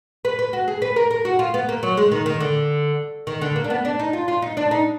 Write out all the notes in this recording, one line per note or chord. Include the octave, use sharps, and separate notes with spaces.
B4
B4
F#4
G#4
B4
A#4
A#4
F#4
F4
B3
A#3
F#3
G#3
D#3
D#3
D3
D#3
D3
A#3
D4
B3
D4
D#4
F4
F4
D#4
D4
D#4